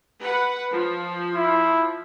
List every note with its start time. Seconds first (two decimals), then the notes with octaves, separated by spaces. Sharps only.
0.21 B4 F#5
0.71 F3
1.35 E4